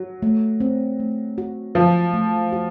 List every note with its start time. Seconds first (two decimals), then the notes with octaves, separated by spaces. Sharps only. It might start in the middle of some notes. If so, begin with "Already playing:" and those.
Already playing: F#3 F#4
0.22 A3
0.60 C4
1.00 A3
1.38 F#4
1.75 F3 F#3
2.14 A3
2.52 F#4